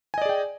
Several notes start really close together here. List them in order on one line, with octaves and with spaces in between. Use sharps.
G#5 D#5 D5 G#4 G5